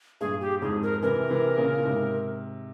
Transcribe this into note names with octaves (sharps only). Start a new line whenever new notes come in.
G2 A#2 G#4
G4
F2 G#2 G#4
A#4
C3 E3 A#4
C3 E3
A#2 C#3
A#2
G#2 C3